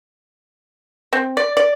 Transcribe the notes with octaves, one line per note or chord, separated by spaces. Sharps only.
C4
D5
D5